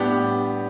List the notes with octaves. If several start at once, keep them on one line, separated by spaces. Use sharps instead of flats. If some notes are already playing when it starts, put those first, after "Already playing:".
Already playing: A2 G3 B3 D4 G4